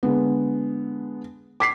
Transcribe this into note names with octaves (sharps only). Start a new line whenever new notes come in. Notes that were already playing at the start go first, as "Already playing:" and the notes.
D3 G#3 B3
D6 B6 C7